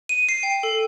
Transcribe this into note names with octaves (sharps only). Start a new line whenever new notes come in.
D#7
C7
G5
A4